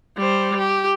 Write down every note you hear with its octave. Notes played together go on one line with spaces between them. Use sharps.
G3 C5
G4